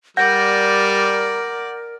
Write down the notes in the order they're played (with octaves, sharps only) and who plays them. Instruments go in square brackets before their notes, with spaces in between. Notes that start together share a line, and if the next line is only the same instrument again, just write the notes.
[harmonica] G3 [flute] A#4 [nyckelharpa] D5 [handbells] F#5 G6 A#6